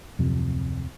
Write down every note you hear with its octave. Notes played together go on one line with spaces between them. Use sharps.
D1 F2 C3